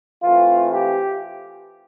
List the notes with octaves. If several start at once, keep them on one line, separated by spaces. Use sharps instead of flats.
E3 A3 C4 F4
G4